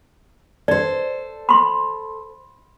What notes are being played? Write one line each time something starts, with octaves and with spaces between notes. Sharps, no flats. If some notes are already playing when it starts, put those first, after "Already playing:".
A4 C5 D5
B5 C6